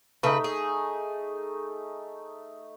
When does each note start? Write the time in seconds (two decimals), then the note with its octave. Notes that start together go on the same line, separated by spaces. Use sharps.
0.23 C#3 A3 D#4 B4
0.44 G#4